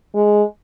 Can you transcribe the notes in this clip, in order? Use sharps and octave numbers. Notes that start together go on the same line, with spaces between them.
G#3